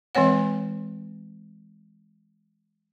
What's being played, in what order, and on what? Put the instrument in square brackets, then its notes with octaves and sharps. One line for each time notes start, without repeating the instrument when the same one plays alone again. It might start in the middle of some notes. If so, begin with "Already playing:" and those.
[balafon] E3 G#3 C4 C#5 F#5